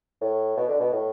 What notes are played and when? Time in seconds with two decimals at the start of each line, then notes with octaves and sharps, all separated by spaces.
0.21 A2
0.57 B2
0.68 D3
0.80 B2
0.92 A2